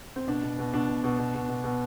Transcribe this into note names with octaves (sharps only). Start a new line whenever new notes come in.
C4
B2 D4
B2
B2
B2 D4
B2
B2
B2
B2
B2
B2